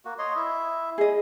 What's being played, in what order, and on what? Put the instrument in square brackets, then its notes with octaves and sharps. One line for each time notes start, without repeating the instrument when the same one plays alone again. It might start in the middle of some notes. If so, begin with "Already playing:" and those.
[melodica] A#3 F#4
C#5 D#5 C6
E4 E5
[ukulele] G#4 D#5